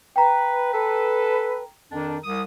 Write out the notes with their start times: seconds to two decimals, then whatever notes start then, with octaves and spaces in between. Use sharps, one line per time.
0.16 B4 G5 A#5
0.72 A4 B4
1.92 F2 D#3 D4
2.23 C2 D#6